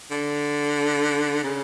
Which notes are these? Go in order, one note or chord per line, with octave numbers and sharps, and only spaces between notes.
D3
C#3